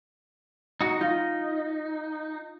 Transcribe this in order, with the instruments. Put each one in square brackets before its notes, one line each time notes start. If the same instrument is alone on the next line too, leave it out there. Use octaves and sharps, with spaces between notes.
[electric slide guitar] D#4 F#4
[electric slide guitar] D#4 [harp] F4